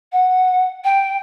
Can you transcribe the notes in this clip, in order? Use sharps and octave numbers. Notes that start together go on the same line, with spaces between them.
F#5
G5